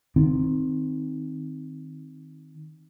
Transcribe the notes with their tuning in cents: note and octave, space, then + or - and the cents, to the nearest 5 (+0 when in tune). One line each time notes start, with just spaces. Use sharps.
D#3 +0 C4 +0